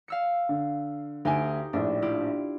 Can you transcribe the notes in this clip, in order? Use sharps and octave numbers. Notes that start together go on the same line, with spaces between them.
F5 E6 C#7
D3
D2 D#4 G4 G5 G#5
A#1 A2 D4
E4 F4 G4